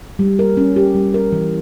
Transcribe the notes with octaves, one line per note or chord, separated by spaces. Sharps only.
G3
A#4
C#4
G4
G3
A#4
E3